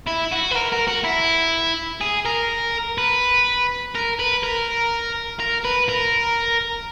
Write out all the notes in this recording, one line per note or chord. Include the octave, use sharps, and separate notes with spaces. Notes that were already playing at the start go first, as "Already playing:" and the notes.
E4
F#4
B4
A#4
A#4
F#4
E4
G#4
A#4
B4
A#4
B4
A#4
A#4
B4
A#4